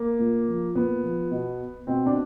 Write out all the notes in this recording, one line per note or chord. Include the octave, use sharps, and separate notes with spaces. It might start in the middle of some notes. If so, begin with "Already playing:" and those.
Already playing: A#3
A#2
F3
A#2 B3
F3
B2
B2 C4
D4